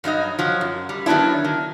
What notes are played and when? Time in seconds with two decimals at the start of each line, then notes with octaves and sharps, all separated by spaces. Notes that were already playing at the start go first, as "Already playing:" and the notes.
0.04 G2 F#3 D#4 D#5
0.39 F3 F#3
0.61 F#2
0.89 G3
1.06 D#3 F#3 B3 D4 E4
1.44 D#3